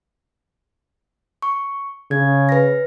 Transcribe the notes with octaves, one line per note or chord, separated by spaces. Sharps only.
C#6
C#3 G#6
B4 A#6